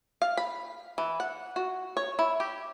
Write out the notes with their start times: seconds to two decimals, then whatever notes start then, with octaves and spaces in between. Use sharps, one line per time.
0.22 F5
0.37 B5
0.98 E3
1.20 F#5
1.56 F#4
1.97 C#5
2.19 E4
2.40 G4